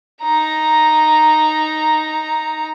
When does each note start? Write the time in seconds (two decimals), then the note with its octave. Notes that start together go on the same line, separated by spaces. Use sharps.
0.22 D#4 A#5